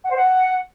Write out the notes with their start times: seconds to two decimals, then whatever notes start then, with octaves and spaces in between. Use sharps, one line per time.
0.03 F#5
0.10 C5
0.16 F#5